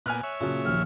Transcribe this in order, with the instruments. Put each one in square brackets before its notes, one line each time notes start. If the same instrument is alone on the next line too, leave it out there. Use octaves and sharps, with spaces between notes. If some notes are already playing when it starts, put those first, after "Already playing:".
[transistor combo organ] A#2 B3 [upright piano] G#5 F6 F#6
[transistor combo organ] C#5 E5
[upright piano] A#2 C#3 F#3 [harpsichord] C#4 A5
[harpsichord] A#1 D#2 F3 [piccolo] F6